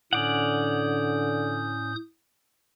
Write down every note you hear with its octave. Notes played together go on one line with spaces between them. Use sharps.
A2 D3 C#4 D5 F#5 D#6 G6